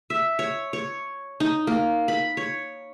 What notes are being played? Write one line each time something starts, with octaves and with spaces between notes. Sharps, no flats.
E5
C#5
C#5
D#4
A#3
B5
C#5